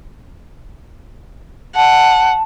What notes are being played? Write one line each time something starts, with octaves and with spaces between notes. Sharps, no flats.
F#5 A5